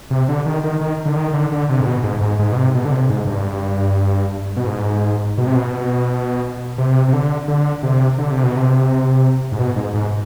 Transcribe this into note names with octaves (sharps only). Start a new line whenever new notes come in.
C3
D3
D#3
D#3
D#3
D3
D#3
D3
D3
C3
G#2
B2
G#2
G#2
G#2
B2
C3
B2
D3
C3
G#2
G2
B2
G#2
B2
C3
B2
C3
C3
D3
D3
C3
D3
C3
B2
C3
G#2
B2
G#2
G#2